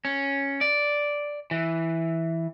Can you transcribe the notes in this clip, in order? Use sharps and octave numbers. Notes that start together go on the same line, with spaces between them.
C#4
D5
E3